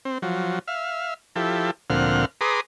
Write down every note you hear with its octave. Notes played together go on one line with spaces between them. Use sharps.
C4
F3 F#3
E5 F5
F3 E4 G4 A4
D2 A#2 F3 C4 F#5 F6
G#4 B4 A#5 C6 D6 D#6